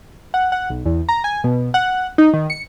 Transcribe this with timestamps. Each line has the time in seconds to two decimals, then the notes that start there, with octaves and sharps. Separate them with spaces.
0.34 F#5
0.52 F#5
0.70 B1
0.86 E2
1.09 A#5
1.24 G#5
1.44 B2
1.74 F#5
2.18 D#4
2.34 D#3
2.50 C#7